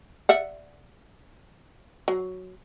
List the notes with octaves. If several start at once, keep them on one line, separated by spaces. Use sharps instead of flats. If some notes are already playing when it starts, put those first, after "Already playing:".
D5 E5 F#5
F#3